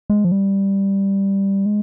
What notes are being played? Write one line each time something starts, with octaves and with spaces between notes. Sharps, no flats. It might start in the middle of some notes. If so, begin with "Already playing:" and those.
G#3
F3
G3
G#3